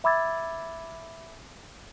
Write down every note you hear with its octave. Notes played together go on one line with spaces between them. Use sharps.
E5 B5 D6 E6 G#6 A6